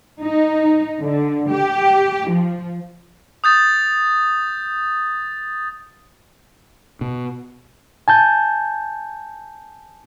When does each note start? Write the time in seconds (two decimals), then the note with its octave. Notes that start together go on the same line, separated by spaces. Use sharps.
0.21 D#4
0.99 D3
1.51 G4
2.29 F3
3.44 D#6 G6 A6
7.01 B2
8.08 G#5 A5 G6